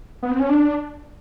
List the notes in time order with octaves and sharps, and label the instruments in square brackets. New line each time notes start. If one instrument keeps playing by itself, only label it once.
[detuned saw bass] B3
C4
C#4
D4